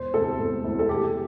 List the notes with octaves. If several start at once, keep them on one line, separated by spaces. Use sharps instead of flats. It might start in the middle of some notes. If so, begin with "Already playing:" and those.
Already playing: E1 C5
D2 C3 E3 A4
E1
D2 C3 E3
A4
E2 G4